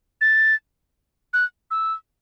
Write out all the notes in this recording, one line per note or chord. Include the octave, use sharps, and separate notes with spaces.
A6
F#6
E6